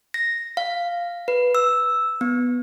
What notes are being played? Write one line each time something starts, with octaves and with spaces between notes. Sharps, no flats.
A#6
F5
B4
E6
B3